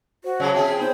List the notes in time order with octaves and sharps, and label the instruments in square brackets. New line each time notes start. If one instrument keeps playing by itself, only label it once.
[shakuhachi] F#4 [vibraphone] C5
[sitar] C#3 F#3 G#4 [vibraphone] C#5 A5
[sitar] C4 F4 G#4 [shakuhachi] E5 [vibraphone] G5
[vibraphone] B3 D#4 C#5 [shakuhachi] C5